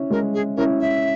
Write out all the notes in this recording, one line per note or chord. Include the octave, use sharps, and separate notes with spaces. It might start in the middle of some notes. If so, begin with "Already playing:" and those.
Already playing: C#4 E4
G#3 A#4
G#4
C#4 E4 A#4
E5